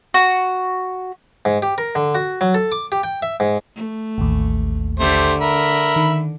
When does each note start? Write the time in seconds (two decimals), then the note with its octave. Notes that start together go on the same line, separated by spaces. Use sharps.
0.14 F#4
1.45 G#2
1.62 G4
1.78 A#4
1.95 D3
2.15 F#4
2.41 F#3
2.54 A4
2.72 D6
2.92 G4
3.04 G5
3.22 E5
3.40 G#2
3.76 A3
4.18 A1 D#2
5.00 D3 A3 G4 C5
5.41 A#4 E5 B5
5.96 D#3